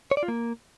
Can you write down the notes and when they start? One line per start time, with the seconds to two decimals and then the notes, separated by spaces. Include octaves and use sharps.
0.11 C#5
0.17 D5
0.23 F4
0.28 A#3